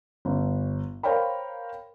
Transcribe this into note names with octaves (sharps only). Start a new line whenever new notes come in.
G1
A#4 C5 C#5 F5 G5 B5